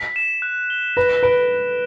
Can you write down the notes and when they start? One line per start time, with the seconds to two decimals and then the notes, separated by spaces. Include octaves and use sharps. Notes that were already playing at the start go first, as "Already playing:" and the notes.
Already playing: B6
0.16 E7
0.42 F#6
0.70 G7
0.97 B4 A#6
1.23 B4 D7